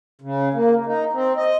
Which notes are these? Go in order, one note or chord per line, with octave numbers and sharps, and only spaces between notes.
C#3
A#3
D#4
C4
D#5